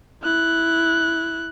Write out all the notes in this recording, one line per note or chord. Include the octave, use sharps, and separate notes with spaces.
E4 F#6